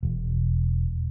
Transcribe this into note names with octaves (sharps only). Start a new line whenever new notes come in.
E1